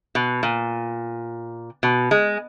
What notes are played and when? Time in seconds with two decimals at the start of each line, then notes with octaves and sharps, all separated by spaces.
0.15 B2
0.43 A#2
1.83 B2
2.11 G#3